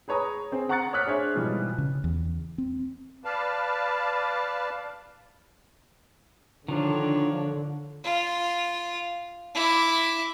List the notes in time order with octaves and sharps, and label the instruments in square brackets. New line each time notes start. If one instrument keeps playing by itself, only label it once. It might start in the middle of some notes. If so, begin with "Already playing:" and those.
[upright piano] G#4 B4 C#5 A#5 D#6
C4 G#4 C5
F#5 A#5 C#6 F#6 A6 C#7
C#5 D6 D#6 F6 F#6 B6
D4 G#4 C5 C#5 E5
G#2 B2 E3 F3 G3
[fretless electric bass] C#3
E2
C4
[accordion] B4 D5 F5 A5
[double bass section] D3 [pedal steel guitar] D#3 F3 F4 [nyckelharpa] D4 C#5
[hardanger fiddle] F4
E4 D6